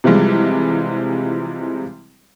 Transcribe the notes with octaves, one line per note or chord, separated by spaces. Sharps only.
C3 E3 F3 G3 G#3